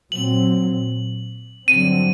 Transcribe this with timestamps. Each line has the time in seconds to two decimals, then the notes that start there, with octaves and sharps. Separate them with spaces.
0.11 A#2 F#3 C4 F#7
1.68 G2 D3 F#3 C4 D#7